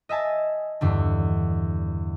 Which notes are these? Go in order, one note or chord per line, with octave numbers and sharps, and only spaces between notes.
D#5 E5 G#5 A5
E2 G2 D3